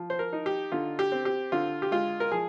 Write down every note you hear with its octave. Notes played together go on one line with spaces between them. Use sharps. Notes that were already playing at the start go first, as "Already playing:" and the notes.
Already playing: F3
C5
A#4
D#4
G4
D3 F4
G4
C4
G4
D3 F4
G4
G#3 F4
A#4
F3 G#4